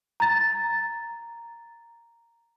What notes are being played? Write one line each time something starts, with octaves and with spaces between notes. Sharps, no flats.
A#5 A6